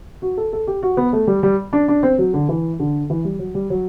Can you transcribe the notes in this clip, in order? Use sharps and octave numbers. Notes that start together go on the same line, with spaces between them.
F#4
A4
A4
G4
F#4
B3
A3
G3
G3
D4
D4
C4
F#3
D3
E3
D3
E3
G3
F#3
G3
F#3